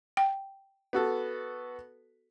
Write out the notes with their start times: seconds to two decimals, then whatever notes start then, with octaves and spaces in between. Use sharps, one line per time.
0.17 G5
0.93 B3 F#4 A4